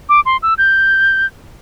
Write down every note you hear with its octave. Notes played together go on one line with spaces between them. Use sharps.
D6
C6
E6
G6